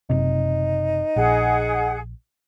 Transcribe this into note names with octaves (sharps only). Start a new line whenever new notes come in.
F#1 C3 D#4
A#1 G#4 F#5